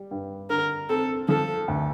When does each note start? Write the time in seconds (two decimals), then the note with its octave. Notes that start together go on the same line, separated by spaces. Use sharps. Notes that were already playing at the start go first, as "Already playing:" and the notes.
Already playing: G3
0.11 G2
0.50 D3 A#4
0.89 C4 A4
1.29 F3 A4
1.68 D2